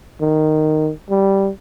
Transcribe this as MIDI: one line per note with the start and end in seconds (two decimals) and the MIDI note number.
0.21 0.91 51
1.10 1.50 55